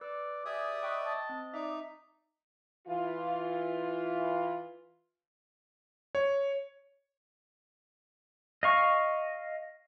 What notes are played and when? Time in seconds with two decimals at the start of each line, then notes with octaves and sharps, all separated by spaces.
0.01 B4 D5 E6
0.45 G4 G#4 D5 E5 D#6
0.83 B4 D#5 G5 C#6
1.05 A5
1.29 C4
1.54 D#4 D5 E5
2.88 E3 F4
6.15 C#5
8.63 D#5 F5 C#6